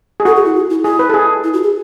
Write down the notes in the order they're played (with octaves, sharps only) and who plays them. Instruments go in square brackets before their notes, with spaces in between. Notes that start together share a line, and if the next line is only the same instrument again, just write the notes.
[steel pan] G#4
[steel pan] F#4 [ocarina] A4
[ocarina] G#4
E4
F#4
E4
[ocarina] E4 [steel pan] G#4
[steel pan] B4
A4
G#4
[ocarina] E4
F#4
G#4